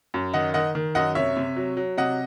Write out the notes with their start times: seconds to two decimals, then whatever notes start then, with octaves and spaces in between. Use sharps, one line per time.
0.14 F#2
0.34 D#3 D#5 F#5
0.54 D#3 D#5 F#5
0.75 D#3
0.95 F#2 D#5 F#5
1.15 C3 C#5 E5
1.37 C3
1.56 F#3
1.77 F#3
1.98 C3 D#5 F#5